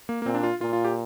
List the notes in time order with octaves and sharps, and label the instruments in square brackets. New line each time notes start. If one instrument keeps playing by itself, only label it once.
[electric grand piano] A#3
A#3
[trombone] A#2 [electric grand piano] C4
[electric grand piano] D4
F4
[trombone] A#2 [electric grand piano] F4
[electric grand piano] F4
G4